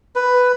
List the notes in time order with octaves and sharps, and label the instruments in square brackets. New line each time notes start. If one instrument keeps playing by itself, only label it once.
[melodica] B4